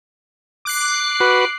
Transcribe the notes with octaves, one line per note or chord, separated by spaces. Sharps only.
D6 F#6 C7
F#4 B4